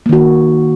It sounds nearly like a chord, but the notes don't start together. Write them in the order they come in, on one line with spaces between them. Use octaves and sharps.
A#3 D#3 F#4